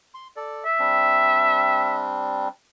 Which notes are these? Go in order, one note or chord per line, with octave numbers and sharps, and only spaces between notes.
C6
A4 D5
E5
G3 C4 D4